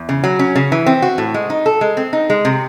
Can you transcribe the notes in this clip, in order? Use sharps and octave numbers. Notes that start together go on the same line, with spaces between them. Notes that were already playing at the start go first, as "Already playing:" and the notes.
Already playing: E2
C#3
F#3
C#4
C#3
E3
C4
F#4
A2
G#3
D#4
A4
G#3
C4
D#4
G#3
C3